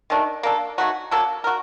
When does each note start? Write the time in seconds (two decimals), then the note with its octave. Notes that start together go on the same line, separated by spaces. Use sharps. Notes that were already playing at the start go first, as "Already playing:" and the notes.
0.10 D#3 A3 D4
0.43 A#3 D4 A4
0.78 F#3 A3 D#4 F#4
1.11 F#3 A#3 D4 A4
1.44 F#4 A#4